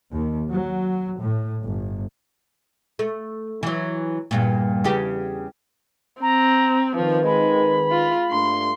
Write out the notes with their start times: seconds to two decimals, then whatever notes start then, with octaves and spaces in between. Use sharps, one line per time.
0.13 D#2
0.52 F#3
1.21 A2
1.64 G1
2.99 A3
3.63 E3 F#3
4.31 E2 G2 A#2
4.84 E2 C#3 G4
6.22 C4 A#5
6.96 D#3 F3 B4
7.26 G#3 B5
7.92 F4
8.31 G2 A3 D4 C6